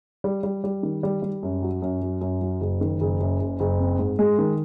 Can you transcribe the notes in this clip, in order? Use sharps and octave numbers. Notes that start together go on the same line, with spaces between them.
G3
G3
G3
D#3
G3
G3
F#2
F#3
F#2
F#3
F#2
F#3
F#1
D#3
F#1
F#2
F#1
F#1
C4
G#2
G#3
D#3